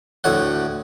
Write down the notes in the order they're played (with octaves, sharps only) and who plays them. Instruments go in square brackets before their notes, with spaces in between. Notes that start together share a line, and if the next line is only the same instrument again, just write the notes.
[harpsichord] D2 A2 C#5 F#5